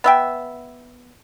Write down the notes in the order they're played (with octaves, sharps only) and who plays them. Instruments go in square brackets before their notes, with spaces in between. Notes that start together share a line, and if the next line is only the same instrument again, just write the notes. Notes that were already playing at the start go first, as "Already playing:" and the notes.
[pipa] B3 E5 G5